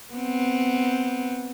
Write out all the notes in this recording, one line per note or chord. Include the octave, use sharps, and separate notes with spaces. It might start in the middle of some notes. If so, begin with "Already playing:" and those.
B3 C4